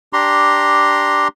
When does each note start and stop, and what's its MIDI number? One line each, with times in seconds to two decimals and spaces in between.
0.13 1.28 62
0.13 1.28 67
0.13 1.28 82
0.13 1.28 84